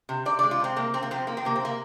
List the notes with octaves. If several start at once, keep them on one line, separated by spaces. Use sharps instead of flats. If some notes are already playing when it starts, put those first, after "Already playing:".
C3
C3 D5
G#3 D5
F4
C3 C4
C3 A#3
C3 C4
A#3
F3 C4
F3 A#3
C4
C3 A#3
C4
C3 A#3